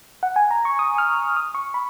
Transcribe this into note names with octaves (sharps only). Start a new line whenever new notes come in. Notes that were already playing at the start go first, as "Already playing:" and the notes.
F#5
G#5
A#5
C#6
D#6
F6
D#6
C#6
B5